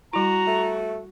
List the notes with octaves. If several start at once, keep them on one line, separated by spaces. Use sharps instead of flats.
G3 E4 F#4 A#5
A3